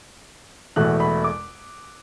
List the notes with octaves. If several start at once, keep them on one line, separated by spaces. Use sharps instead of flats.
E1 E2 B2 A3 E4 F#6
B5
D6